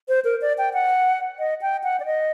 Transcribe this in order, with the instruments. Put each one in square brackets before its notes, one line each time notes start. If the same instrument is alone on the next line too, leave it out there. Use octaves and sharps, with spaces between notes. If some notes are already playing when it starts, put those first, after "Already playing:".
[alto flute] C5
A#4
D5
G5
F#5
D#5
G5
F#5
D5
D#5